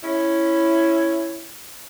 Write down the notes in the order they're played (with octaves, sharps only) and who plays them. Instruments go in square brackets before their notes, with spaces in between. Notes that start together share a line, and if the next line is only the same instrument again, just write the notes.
[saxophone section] C#4 E4